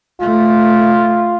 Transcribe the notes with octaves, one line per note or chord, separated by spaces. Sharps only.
A3 F4